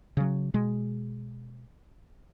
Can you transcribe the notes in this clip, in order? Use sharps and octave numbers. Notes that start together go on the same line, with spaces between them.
C#3 F#3
B2 G#3